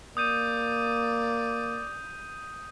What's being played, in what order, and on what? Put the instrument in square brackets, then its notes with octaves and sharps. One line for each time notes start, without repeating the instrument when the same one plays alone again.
[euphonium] A#3 [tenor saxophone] D5 [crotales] D#6 G6 D#7